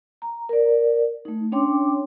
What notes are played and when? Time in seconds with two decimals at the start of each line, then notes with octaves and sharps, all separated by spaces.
0.22 A#5
0.49 A#4 D5
1.25 A3 D#4
1.52 C#4 D4 C#5 G5 C6 D6